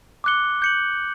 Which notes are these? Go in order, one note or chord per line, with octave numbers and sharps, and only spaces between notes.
D6 F#6 C#7 G7
G6 C#7 F#7